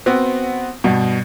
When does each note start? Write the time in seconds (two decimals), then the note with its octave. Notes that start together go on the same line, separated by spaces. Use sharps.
0.06 B3 C4 F#4
0.84 G2 B2